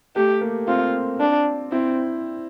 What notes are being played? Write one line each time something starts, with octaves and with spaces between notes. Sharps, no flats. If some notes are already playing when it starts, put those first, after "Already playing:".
A3 G4
A#3
C4 F4
D4
C4 E4